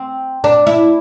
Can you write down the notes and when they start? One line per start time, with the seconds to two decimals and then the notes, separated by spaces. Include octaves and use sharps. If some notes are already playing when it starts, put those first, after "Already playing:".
Already playing: C4
0.44 D4
0.67 E4